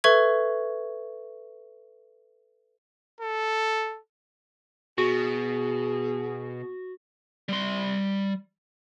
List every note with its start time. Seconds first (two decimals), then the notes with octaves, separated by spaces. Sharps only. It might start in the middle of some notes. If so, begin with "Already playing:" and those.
0.04 A4 B4 E5 C#6 G#6
3.21 A4
4.98 B2 F#4 G#4
7.49 G3 C6